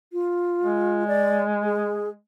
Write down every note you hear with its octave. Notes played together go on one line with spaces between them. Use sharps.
F4
G#3
D5
G#4